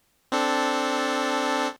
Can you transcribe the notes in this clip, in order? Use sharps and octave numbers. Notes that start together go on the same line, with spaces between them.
C4 D4 A4